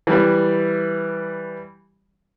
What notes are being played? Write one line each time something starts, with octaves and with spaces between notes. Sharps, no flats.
E3 G3